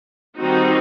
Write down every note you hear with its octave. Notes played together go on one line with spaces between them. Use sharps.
D#3 G3 C4 D#4 F#4